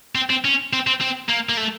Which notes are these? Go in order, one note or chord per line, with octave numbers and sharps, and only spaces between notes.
C4
C4
C#4
C4
C4
C4
A#3
A#3
A3